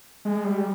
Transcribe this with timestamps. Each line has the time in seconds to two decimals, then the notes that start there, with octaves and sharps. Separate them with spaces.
0.25 G#3
0.45 G3